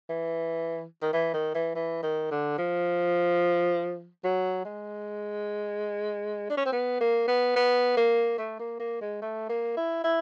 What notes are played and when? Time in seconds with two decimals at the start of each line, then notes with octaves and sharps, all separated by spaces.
0.10 E3
1.02 D#3
1.13 E3
1.34 D#3
1.55 E3
1.75 E3
2.03 D#3
2.31 D3
2.58 F3
4.24 F#3
4.65 G#3
6.50 D4
6.57 C#4
6.66 C4
6.72 B3
7.01 A#3
7.28 B3
7.56 B3
7.97 A#3
8.38 A3
8.59 A#3
8.80 A#3
9.01 G#3
9.22 A3
9.49 A#3
9.77 E4
10.04 E4